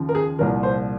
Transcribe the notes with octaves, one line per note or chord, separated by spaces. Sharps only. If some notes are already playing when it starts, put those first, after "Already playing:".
Already playing: D#2 C#3 F3
A#4
G#4
C2 A#2 F3 A#4
C5